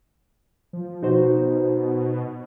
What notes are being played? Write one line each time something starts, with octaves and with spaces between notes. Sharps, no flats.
F3
B2 D#4 F#4 C5